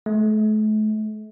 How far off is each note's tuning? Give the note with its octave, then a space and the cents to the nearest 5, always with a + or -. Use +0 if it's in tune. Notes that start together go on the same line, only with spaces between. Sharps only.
A3 -40